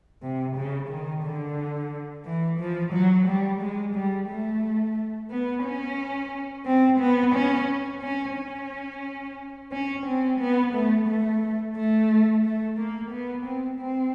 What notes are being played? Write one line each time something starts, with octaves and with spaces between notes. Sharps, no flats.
C3
C#3
D#3
D3
E3
F3
F#3
G3
G#3
G3
A3
B3
C#4
C4
B3
C#4
C#4
C#4
C#4
C4
B3
A3
A3
A3
A3
A#3
B3
C4
C4